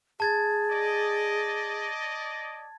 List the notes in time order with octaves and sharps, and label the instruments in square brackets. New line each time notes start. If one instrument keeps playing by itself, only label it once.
[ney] G#4 [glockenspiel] A5 G#6 A6
[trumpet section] D5 D#5